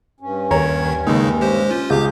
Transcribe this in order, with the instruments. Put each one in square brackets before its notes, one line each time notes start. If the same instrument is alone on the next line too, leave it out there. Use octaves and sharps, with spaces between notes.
[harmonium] G2 C#4
[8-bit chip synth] D#2 D#3 G#6 [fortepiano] A#4 C#5 A#5
[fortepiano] D#2 [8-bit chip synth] C#3 G#3 D#4
[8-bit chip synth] G#3 G4 C5
C#4 F4
[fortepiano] C#2 [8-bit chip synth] G4 D6 G6 [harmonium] G#4